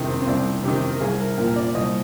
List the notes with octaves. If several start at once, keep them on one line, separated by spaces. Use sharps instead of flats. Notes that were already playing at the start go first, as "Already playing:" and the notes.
Already playing: C2 C3 D#3 G#3
C4
C4
C2 D4
C3 D#3 G4
A#4
C2 G#4
A#4
A#2 F3 A#4
D5
C2 D#5